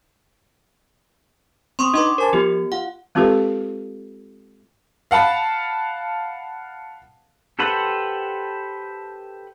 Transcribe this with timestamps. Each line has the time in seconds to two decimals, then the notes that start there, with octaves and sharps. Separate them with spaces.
1.79 C4 C6 C#6 D#6
1.94 D4 D#4 B4 C6 D6
2.18 A#4 C5 G#5 A5
2.33 F3 B3 G4
2.72 F4 F#5
3.15 G#3 C4 F4 G4 A4 B4
5.11 F5 F#5 A5 B5
7.59 G4 A4 B4 C5 F#5